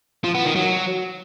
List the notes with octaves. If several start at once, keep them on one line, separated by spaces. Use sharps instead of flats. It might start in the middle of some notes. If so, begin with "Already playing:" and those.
F3
B3
D#3
F#3